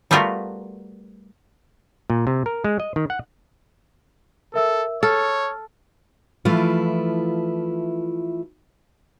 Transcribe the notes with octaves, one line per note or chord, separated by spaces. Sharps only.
G3 A3 B3 F4 F#4 A#4
A#2
C3
A#4
G#3
D#5
D#3
F#5
A4 A#4 E5 E6
A4 C#5 F6
E3 F3 A3 E4 F4